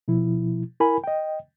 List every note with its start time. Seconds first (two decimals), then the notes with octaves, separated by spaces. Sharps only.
0.08 B2 F3 E4
0.80 E4 A#4 G#5 B5
1.04 D#5 G5